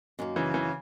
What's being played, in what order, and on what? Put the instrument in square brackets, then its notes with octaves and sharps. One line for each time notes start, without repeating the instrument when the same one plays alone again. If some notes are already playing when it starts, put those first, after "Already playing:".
[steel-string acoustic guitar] F#2 D#3 A#3
[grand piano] C#3 E3
C#3 E3